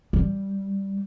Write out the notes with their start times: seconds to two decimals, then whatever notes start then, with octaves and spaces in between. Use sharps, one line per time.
0.13 G3